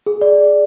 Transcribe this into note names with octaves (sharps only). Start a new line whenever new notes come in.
G#4
D5